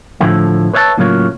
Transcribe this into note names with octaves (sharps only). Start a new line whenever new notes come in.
A2 D3 F3 A3 E4
B4 C#5 E5 F5 A5
A2 C#3 F#3 A#3 F4 C#5